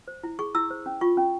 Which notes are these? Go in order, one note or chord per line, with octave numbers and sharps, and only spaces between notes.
C5
E4
G#4 C#6
E4 E6
C5
C#4
F4 C#6
C#4